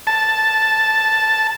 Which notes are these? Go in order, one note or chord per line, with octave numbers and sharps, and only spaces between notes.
A5